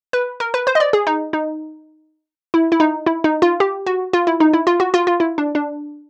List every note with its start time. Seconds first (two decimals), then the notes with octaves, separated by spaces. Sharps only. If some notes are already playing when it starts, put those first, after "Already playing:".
0.13 B4
0.40 A#4
0.54 B4
0.67 C5
0.75 D#5
0.80 D5
0.93 G#4
1.07 D#4
1.33 D#4
2.54 E4
2.72 E4
2.80 D#4
3.07 E4
3.24 D#4
3.42 F4
3.60 G4
3.86 F#4
4.13 F4
4.27 E4
4.40 D#4
4.53 E4
4.67 F4
4.80 F#4
4.94 F4
5.07 F4
5.20 E4
5.38 D4
5.55 D4